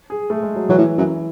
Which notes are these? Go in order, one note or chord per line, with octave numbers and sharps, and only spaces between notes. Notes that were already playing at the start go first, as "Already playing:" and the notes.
G#4
A3
G#3
F#3
E3 F#3
A2
F#2